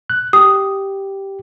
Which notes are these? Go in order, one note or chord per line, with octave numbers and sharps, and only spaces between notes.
F#6
G4 D#6